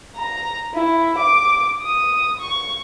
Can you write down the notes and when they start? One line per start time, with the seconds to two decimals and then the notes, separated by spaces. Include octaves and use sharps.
0.16 A#5
0.74 E4
1.18 D6
1.82 D#6
2.40 C#6